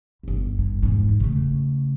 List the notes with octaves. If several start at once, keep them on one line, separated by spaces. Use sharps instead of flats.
D1 G1
G2
E2 G#2
C#3 A3